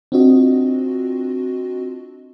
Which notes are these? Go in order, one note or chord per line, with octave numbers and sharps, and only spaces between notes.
C4 D4 F4 F#4 D#5